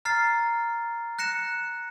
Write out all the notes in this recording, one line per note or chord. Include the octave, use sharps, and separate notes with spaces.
A#5 F6 A6 C7
F#6 A#6 C#7 E7